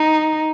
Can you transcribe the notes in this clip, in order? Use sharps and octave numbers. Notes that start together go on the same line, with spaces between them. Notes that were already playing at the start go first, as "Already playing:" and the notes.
Already playing: D#4